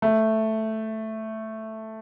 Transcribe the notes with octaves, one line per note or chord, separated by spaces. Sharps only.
A3